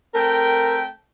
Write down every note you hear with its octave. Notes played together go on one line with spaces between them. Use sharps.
A3 C4 A#4 G5